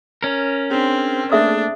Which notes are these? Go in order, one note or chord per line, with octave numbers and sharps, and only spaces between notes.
C#4 A#4
C4 D4 G#4
A3 A#3 D4 G#4 A4 E5 D#6